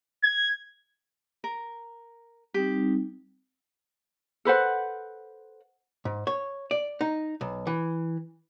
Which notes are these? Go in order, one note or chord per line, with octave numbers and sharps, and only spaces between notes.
G#6
A#4
G3 C4 D#4 G4
A4 B4 C5 F#5
G#2
C#5
D5
D#4
B1
E3